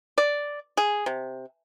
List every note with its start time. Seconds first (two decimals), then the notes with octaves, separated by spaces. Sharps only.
0.18 D5
0.77 G#4
1.06 C3